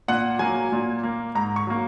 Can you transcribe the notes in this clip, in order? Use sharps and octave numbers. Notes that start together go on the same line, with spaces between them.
A#2 F#5
F#3 A#3 G#5
A#2
A#3
G#2 A#5
C#6
F#3 A#3